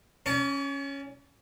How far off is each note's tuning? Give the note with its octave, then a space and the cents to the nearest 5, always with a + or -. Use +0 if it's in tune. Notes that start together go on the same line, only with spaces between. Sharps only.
C#4 +0 C#5 +45 A5 +10